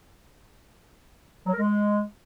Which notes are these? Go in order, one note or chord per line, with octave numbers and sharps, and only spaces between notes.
F#3
A#4
G#3